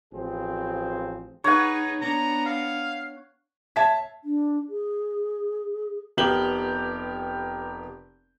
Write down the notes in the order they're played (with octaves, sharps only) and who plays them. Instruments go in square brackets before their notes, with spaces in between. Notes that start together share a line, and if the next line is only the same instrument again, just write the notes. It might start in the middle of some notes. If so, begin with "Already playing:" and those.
[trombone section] A1 F3 C4 G#4
[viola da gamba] D#4 G#4 B4 [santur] C#5 F#5
[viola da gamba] B3 D4 [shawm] A#5
[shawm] F5
[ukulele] C#5 E5 [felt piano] A5 G#6 B6
[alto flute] D4
G#4
[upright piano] F1 B3 G4 A#4 F#7 G7